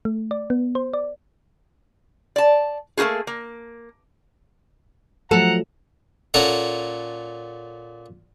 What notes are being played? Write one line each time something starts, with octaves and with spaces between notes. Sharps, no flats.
A3
D5
B3
C5
D5
D5 A5
A3 A#3 D#4 F#4 G#4
A#3
F3 F#3 A3 A4 F#5 A#5
A#2 C#4 A4 F#5 A#5